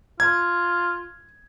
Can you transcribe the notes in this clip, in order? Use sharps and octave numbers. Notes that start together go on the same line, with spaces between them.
F4 G#6